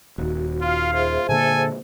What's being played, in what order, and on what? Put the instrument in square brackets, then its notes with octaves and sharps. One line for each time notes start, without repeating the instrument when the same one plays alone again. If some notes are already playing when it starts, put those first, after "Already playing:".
[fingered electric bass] D#1 D#2 [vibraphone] F#4
[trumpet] F4 [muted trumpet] F5
[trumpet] F4 [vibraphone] G#4 C5 E5
[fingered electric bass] A#2 D3 A#3 [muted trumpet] A4 [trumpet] G#5